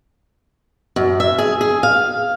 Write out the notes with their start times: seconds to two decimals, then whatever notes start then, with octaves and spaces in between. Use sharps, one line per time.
0.96 F#2
1.20 E5
1.38 G#4
1.61 G#4
1.83 F5